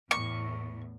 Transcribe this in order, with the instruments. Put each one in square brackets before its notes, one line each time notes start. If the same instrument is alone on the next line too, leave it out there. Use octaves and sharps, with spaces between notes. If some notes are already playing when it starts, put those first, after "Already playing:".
[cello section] E2 A2 [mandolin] C#6